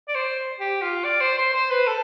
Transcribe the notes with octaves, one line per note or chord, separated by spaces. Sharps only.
D5
C5
G4
F4
D5
C5
C5
C5
B4
A4